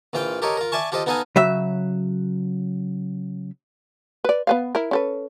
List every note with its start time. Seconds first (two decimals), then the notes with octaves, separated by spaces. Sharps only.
0.13 A#1 E3 F4 F5 G5
0.42 G4 A4 A#4 C#5 D#5
0.57 F4 A#4
0.72 D5 E5 G#5 A5 C#6
0.92 F4 G4 A4 C5 D#5
1.06 B3 D#4 A4 D#5 F5 G#5
1.36 C#3 F#3 E5
4.25 B4 D5
4.47 B3 B4 F5
4.75 E4 A#4
4.91 C#4 A4 B4